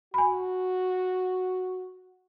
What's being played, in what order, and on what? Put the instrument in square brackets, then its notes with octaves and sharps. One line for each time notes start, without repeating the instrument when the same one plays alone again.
[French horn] F#4 [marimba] G#5 B5